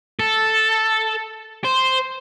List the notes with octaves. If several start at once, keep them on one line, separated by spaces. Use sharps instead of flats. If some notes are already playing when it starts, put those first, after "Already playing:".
A4
C5